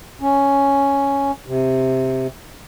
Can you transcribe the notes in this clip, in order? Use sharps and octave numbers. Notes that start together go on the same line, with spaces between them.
C#4
C3